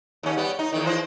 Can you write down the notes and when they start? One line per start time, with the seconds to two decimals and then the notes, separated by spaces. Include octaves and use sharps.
0.23 D#2 C#4
0.37 G3 B3
0.59 D#4
0.72 E2 D#3
0.86 E3 C5